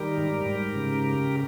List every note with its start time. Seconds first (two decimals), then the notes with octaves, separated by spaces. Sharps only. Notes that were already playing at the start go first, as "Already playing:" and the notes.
Already playing: D#3 G3 G4 A#4
0.17 G#2
0.46 G#2
0.76 C#3